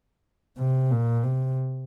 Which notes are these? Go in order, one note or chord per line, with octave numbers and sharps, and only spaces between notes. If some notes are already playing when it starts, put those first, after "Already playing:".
C3
A#2
C3